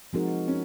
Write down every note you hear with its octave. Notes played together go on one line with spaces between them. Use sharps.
F3 G#3 C4 D#4 F#4 A#4
C#4